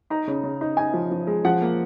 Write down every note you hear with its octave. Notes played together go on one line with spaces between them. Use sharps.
D#4 A#5
C#3
C#3
D#4
D#4 G#5
F3
F3
G#3
F3 F#5
A#3